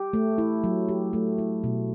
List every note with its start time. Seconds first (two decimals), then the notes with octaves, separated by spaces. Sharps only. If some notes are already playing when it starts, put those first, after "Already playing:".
Already playing: G4
0.13 A3
0.38 E4
0.64 F#3
0.89 G4
1.13 A3
1.38 E4
1.64 B2